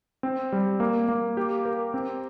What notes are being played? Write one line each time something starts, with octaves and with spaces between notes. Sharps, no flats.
C4
G3
A#3
A#3
G4
A#4
C4